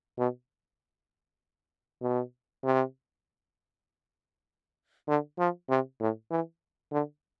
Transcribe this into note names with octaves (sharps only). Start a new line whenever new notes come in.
B2
B2
C3
D3
F3
C3
A2
E3
D3